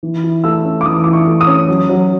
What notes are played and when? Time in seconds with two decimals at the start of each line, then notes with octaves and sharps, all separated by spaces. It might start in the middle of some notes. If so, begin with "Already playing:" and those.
0.03 E3
0.24 E4
0.44 A3 E6
0.65 C#4
0.81 D6
0.86 E3 D#6
1.04 E4 D6
1.13 C#6
1.27 A3
1.41 D#6
1.47 C#4
1.68 F#3
1.89 F#3